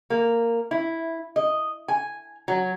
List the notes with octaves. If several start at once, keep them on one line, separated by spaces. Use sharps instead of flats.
A#3
E4
D#5
G#5
F#3